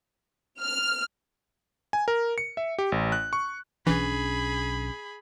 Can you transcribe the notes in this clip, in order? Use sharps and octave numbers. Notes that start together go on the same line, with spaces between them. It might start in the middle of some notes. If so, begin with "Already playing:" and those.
F6
G#5
A#4
C#7
E5
G4
A1
F#6
C#6
B1 E3 C#4 D4 G#4 B5